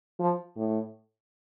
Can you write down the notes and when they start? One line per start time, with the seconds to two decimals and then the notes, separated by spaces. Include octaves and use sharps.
0.20 F3
0.56 A2